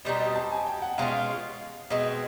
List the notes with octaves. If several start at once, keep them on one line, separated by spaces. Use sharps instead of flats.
B2 G3 C4 D#4 D#5
D#5
A5
G#5
G5
F#5
B2 G#3 C#4 F4 F5
B2 G#3 C4 D#5